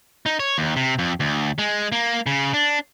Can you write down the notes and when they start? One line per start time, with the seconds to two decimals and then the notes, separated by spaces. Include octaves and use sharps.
0.26 D#4
0.40 C#5
0.58 D#2
0.76 C3
0.99 F2
1.20 D2
1.58 G#3
1.92 A#3
2.26 C#3
2.54 D4